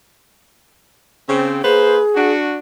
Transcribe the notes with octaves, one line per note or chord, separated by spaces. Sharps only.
C#3 C4
A#3 G#4 B4 C5
D4 F#4